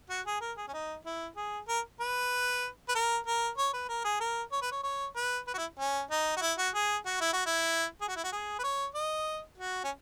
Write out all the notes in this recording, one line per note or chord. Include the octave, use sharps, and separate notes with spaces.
F#4
G#4
A#4
G#4
C#4
D#4
E4
G#4
A#4
B4
B4
A#4
A#4
C#5
B4
A#4
G#4
A#4
C#5
B4
C#5
C#5
B4
B4
F#4
E4
C#4
D#4
F#4
E4
F#4
G#4
F#4
E4
F#4
E4
G#4
F#4
E4
F#4
G#4
B4
C#5
D#5
F#4
C#4